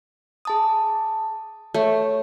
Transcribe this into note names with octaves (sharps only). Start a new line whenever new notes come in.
G#4 A5 D#6
A3 C#5